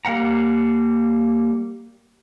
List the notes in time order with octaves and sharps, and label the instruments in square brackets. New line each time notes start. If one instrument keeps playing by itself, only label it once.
[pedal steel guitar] G3 A#3 F5 F#5 A#5